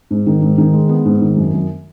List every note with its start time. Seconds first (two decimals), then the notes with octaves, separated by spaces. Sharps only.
0.10 G#2
0.27 D#3
0.41 G#2
0.58 D#3
0.73 G#3
0.89 B3
1.05 G#2
1.21 D#3
1.37 F#2
1.53 F#2